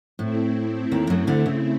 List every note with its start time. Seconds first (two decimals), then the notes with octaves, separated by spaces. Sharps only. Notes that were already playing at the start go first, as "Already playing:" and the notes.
0.19 A2 A3 C4 E4
0.92 D#2 D#3
1.10 F#2 F#3
1.27 D2 D3
1.46 C#3